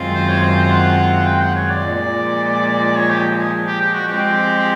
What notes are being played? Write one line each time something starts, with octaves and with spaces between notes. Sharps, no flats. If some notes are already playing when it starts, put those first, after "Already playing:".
Already playing: F#2 D#3 G#3 C4 F4
C5
C#5
C5
C5
F#5
G5
F#5
C#5
D5
A#2 F3 G#3
C#5
G4
G#4
G4
G4
F#4
F3 G#3 C4 G4